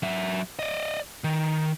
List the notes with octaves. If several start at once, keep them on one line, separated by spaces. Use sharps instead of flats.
F#3 E5
D5 D#5
D#3